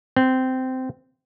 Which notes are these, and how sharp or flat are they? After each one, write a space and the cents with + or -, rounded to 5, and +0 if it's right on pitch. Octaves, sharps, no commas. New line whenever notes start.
C4 -15